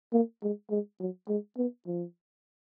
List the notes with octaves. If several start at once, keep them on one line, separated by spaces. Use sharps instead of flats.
A#3
G#3
G#3
F#3
G#3
B3
F3